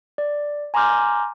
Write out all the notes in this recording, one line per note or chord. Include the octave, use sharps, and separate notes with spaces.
D5
G#5 A#5 C6 D6 F6 G6